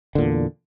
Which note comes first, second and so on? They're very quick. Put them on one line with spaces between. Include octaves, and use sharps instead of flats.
D3 A#2 E2